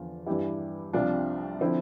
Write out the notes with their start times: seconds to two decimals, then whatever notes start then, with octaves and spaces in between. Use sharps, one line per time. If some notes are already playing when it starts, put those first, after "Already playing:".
Already playing: E2 D3 F3 F4
0.26 G2 E3 E4 G4
0.93 C2 C3 F3 D4 F4
1.61 D3 F3 C4 E4